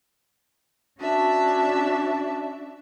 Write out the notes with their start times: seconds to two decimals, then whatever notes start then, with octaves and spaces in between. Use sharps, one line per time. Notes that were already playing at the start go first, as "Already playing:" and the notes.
0.99 C#4 D4 F#4 E5 A5